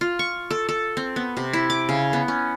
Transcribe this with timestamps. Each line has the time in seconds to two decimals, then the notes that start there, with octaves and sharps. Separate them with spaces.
0.01 F4
0.19 C#6
0.51 A4
0.69 A4
0.97 C4
1.16 B3
1.37 C3
1.53 E4
1.70 D6
1.89 C#3
2.13 B3
2.28 C#4